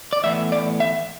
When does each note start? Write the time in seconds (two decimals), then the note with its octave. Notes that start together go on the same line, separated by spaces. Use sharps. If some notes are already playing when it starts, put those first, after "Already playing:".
0.13 D5
0.24 A2 E3 B3 E5
0.52 D5
0.80 E5